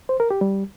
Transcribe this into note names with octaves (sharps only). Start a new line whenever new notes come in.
C5
A#4
G4
G3